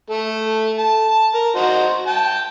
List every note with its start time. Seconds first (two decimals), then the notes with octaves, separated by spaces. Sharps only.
0.10 A3 A4
0.78 A5
1.10 A5
1.34 A#4
1.56 D#4 F#4 C5
2.07 G5 A5